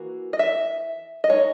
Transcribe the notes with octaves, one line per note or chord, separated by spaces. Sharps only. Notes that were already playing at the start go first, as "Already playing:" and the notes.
Already playing: E3 A#3 F#4
D#5
E5
D#5
G#3 D#4 C#5